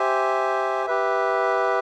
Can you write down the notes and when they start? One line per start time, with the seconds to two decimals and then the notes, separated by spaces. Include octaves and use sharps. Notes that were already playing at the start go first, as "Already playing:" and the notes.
Already playing: G4 C5 E5 G#5
0.86 G4 B4 E5